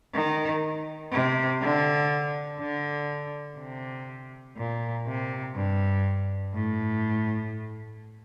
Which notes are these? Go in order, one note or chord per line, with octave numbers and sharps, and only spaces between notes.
D#3
C3
D3
D3
C3
A#2
C3
G2
A2